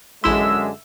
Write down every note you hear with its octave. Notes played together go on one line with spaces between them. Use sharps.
A1 F#2 D3 G#3 E4 E5 C6 E6